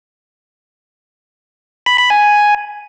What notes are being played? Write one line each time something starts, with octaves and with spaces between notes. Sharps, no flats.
B5
B5
G#5